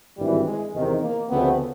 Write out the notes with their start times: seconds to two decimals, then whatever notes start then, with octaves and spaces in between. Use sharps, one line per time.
0.17 G#1 G2 E3 G3
0.46 G#3
0.73 E2 C3 D#3
1.02 A#3
1.30 D2 C#3 F3 A3 B3 C4